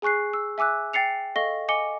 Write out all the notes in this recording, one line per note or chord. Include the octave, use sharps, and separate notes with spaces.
G#4 G#5 C#6 F#6 C7
E6
E5 G#5 D6 E6 F#6
G5 A6 C7 C#7 F7
A4 D#5 F5 C#6 A#6 G7
D#5 G#5 D6 C#7 G7